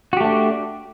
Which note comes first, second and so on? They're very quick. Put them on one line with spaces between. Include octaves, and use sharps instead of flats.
F#4 G4 A3 D4